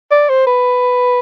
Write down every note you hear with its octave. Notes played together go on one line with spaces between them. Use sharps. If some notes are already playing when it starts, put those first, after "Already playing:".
D5
C5
B4